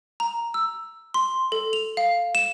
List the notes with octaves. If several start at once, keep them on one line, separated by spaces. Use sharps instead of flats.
A#5
E6
C6
A4
F7
F5
E7